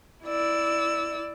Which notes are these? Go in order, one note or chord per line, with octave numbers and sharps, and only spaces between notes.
E4 D5 E6